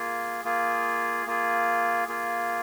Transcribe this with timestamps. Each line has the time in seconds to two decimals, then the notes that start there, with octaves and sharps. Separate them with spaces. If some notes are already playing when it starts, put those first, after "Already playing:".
Already playing: A#3 F4 G#4
0.44 A#3 F4 G#4
1.26 A#3 F4 G#4
2.08 A#3 F4 G#4